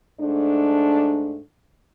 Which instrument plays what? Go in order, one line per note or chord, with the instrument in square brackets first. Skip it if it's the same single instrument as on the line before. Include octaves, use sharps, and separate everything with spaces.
[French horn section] G#2 A3 D4